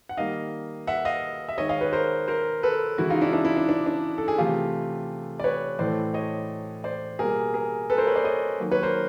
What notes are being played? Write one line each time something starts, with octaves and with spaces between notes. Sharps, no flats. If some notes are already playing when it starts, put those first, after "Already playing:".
F#5
D#3 G3 A#3 D#5 F5
E5 F#5
D#5 F5
E5
D#3 G#3 C#5 D#5
D#5 F5
B4 C#5
A#4 C5
A#4 C5
A4 B4
C#3 E3 G#3 E4 F#4
D#4 F4
D4 E4
D4 E4
D4 E4
D4
D4
D4
A4
G#4
C3 E3 A3 F4 G4
D5
B4 C#5
A2 E3 A3 C5 D5
C#5 D#5
C5 D5
B2 G3 A#3 G#4 A#4
G#4 A#4
A4 B4
A#4 C5
B4 C#5
C5 D5
C#5 D#5
D#3 F#3 A#3
B4 C#5
A#4 C5